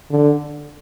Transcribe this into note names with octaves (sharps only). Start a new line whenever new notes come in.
D3